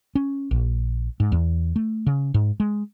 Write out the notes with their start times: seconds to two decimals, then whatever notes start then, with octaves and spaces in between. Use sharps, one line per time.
0.15 C#4
0.51 A#1
1.20 G#2
1.32 E2
1.76 A3
2.06 C#3
2.34 G#2
2.60 G#3